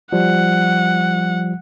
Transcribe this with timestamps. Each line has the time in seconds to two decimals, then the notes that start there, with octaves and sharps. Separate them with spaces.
0.13 F3 G3 F#5